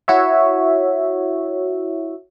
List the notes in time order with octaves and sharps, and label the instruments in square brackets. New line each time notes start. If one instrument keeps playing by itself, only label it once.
[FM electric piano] E4 F#4 C#5 E5